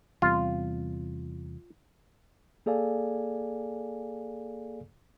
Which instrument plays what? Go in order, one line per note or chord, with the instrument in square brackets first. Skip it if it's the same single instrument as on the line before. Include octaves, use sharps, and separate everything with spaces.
[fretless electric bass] E2 C3 G3 [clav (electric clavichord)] F4
[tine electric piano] A#3 G#4 A4 D5 F5 G#5